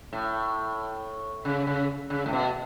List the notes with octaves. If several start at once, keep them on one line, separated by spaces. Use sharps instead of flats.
A2
C#3
C#3
C#3
A2
B2